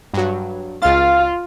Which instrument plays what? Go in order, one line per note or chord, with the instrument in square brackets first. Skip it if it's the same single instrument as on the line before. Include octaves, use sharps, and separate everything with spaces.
[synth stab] G2 F#3
[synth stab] C#2 A6 [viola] F4 [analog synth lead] F5